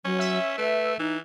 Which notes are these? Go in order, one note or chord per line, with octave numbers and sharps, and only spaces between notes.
F#3 C#4
E5
A3 B4
E3 D#4